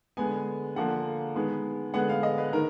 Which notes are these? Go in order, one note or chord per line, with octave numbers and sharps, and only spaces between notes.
D3 G#3 B3 G#5
D3 F3 A#3 F#5
D#3 G#3 B3
D3 G#3 B3 F#5
F5
D#5
B4
D#3 A#4